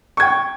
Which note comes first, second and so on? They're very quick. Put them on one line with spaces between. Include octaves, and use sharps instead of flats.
C#6 G#6 G5